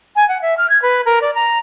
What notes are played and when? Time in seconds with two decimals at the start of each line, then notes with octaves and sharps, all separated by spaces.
0.16 G#5
0.28 F#5
0.42 E5
0.57 F6
0.70 G#6
0.82 B4
1.05 A#4
1.21 D5
1.35 A#5